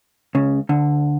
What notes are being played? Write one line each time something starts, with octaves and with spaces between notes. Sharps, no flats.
C#2 C#3
D2 D3